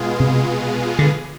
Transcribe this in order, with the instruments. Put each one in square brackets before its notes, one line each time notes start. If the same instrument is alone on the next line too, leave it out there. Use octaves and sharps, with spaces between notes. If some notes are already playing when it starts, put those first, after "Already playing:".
Already playing: [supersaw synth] B2 G#3 B3 F4 G#4
[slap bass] C3
D3